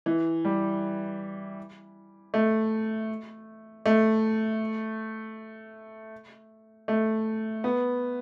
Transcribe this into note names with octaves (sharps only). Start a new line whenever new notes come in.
E3
G3
A3
A3
A3
B3